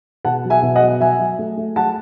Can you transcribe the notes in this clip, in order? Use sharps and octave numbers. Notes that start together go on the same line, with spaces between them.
B2 F#5 A5
F#3
E5 G#5
B2
D#5 F#5
F#3
F#3 E5 G#5
F#3
A3
A3
F#3 F#5 A5